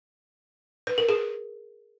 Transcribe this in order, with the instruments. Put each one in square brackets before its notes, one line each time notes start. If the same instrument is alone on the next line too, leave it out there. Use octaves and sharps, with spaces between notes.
[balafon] B4
A#4
G#4